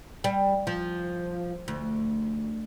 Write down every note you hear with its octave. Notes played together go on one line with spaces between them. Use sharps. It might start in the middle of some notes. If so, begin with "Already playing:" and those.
G3
F3
D2